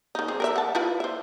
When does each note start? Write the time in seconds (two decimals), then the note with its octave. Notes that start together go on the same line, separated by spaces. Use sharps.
0.15 D#3 D#4
0.28 C4 G#4
0.40 A#4 B4 E5
0.56 F#5 A5
0.75 E4 F4 B4
1.00 C5 E5